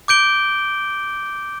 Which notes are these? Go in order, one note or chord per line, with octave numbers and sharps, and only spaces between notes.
D6 G6 D7 G7